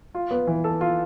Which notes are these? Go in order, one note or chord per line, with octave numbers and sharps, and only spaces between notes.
F4
B3
E3
A4
F4